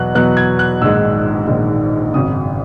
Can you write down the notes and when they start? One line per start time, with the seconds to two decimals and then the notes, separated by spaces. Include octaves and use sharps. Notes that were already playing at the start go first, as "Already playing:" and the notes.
Already playing: E2 B2 F#3 B3 F#6
0.15 E2 B2 F#3 B3 F#6
0.37 G#6
0.59 F#6
0.81 A#1 G#2 D#3 G#3 E6
1.47 A#1 G#2 D#3 G#3
2.14 G#1 F#2 C#3 D#6